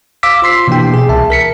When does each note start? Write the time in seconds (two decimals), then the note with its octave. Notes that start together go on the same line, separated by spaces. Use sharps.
0.23 F5 D6 E6 B6
0.42 F4 C5 C6 B6 C7
0.68 B2 E3 A#3 D4 G4 G5
0.94 G#4
1.09 C2 E5 A5
1.30 A#4 B6 C#7